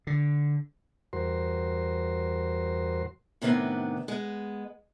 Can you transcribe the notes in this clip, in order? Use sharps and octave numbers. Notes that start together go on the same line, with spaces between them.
D3
E2 G2 F#4 A#4 C5 C6
A2 C3 D#3 B3 D4
G#3 B3